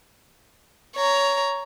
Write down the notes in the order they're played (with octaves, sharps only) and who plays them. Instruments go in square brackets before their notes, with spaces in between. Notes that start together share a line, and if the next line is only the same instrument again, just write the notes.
[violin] C#5 A#5